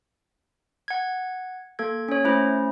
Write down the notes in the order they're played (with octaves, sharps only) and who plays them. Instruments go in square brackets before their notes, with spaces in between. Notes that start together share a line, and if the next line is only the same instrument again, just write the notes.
[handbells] F#5 G#6
A#3 A4 G#6
C#4 C#5
A3 C#4 E4 C5